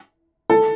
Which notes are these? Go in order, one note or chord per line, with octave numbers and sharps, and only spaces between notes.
A4